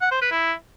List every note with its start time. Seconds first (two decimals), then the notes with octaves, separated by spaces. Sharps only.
0.02 F#5
0.12 C5
0.21 B4
0.31 E4